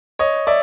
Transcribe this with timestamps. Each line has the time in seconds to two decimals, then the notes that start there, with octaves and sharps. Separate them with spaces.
0.19 C#5 D#5
0.47 D5 E5